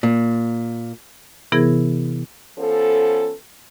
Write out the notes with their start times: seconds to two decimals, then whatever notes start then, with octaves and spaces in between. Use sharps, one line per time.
0.03 A#2
1.52 C3 E3 B3 E4 G#4 A#4
2.58 F3 B3 C#4 A4